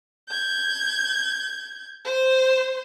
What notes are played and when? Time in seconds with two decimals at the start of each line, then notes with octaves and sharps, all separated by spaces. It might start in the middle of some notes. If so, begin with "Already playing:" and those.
0.29 G6 G#6
2.05 C5 C6